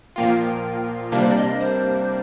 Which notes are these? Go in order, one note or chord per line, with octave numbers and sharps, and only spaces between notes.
A#2 F3 A#3 F4 G5
C3 G3 A#3 D4 F5
C5
D5
D#5
C5